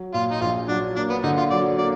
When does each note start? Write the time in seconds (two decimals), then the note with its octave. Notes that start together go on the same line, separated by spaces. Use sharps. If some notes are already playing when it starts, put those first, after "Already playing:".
Already playing: F#3
0.14 A#2 F4
0.32 D#4
0.41 A#1 F4
0.69 F#3 D4
0.96 A#3 D4
1.10 B3
1.23 D3 D#4
1.38 F4
1.51 F#3 D5
1.78 A#3 D5